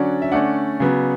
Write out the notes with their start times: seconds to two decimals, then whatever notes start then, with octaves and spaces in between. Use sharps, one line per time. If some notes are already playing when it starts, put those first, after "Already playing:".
Already playing: D3 F#3 C#4 D5 F#5
0.22 E5
0.32 D3 A3 C#4 D5 F#5
0.80 C#3 F#3 B3